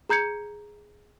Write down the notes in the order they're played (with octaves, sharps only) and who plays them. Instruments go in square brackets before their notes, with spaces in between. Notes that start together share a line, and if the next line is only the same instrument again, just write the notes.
[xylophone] G#4 A#5 G6 G#6 C#7